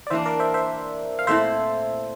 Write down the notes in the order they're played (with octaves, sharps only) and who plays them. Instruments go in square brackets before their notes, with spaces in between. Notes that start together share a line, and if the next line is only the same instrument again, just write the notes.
[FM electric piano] D5
[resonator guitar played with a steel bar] E3 A#3 D4 [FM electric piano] C5 E5
[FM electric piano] A#4 D5
C5 E5
C5 E5
F5
[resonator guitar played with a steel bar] A#2 A3 C4 E4 [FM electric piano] C5 E5